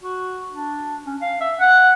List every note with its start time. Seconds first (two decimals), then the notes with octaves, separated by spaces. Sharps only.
0.02 F#4
0.52 D4
1.06 C#4
1.21 F5
1.41 E5
1.59 F#5